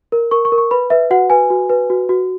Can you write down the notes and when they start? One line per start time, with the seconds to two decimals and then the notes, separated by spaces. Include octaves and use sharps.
0.12 A#4
0.31 A#4 C#6
0.45 C#6
0.52 A#4
0.58 C#6
0.71 B4 B5
0.90 B4 E5
1.11 F#4 F#5
1.30 B4 G#5
1.50 F#4
1.69 B4
1.90 F#4
2.09 F#4